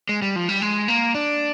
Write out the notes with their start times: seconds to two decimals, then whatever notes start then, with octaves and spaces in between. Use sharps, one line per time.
0.09 G#3
0.22 G3
0.36 F3
0.49 G3
0.62 G#3
0.88 A#3
1.15 D4